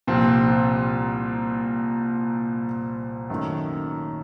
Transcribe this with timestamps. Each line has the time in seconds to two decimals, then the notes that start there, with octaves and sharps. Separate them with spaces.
0.07 C2 A#2 F3 C4
3.30 F#2 D#3 A3